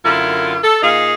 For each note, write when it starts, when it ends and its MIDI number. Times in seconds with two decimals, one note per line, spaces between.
0.04 0.57 42
0.04 0.57 50
0.04 0.57 64
0.04 0.57 65
0.04 0.57 70
0.63 0.79 69
0.82 1.13 46
0.82 1.13 63
0.82 1.13 68
0.82 1.13 77